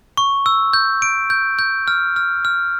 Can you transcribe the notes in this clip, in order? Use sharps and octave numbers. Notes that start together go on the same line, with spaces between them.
C#6
E6
G6
D7
G6
G6
F6
F6
F6